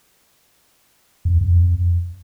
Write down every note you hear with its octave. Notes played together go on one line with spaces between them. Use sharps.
F2
E2
F2